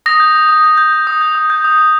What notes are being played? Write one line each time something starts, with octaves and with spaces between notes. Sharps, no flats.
D#6 A#6
G6
D#6
D#6
G6
G6
G6
D#6
G6
D#6
G6
D#6
D#6